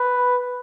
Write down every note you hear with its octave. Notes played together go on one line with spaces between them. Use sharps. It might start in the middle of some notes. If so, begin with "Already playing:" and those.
Already playing: B4